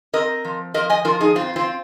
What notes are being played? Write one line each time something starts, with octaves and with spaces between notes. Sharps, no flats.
C4 A#4 D#5
F3
F3 A#4 D#5
D#5 G#5
F3 F4 A#4
D#4 G#4
F2 C4 F4
C4 F4